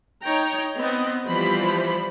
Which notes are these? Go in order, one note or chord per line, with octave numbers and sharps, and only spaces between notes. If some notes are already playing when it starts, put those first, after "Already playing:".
D#4 C#5 G5 A#5
B3 C4 D#5
E3 F3 G3 C5 B5